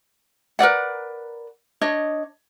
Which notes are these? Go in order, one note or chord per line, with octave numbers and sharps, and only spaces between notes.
A#4 B4 D5 F#5
D4 C#5 D#5